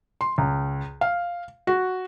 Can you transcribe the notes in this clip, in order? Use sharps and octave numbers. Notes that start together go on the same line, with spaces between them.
C6
C#2
F5
F#4